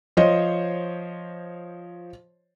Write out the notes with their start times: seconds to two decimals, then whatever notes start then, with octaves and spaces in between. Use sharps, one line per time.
0.17 F3 C5 C#5 D#5